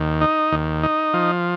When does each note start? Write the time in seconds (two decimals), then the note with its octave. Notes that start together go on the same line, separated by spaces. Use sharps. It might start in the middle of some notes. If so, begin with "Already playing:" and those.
Already playing: D#2
0.21 D#4
0.52 D#2
0.83 D#4
1.14 F3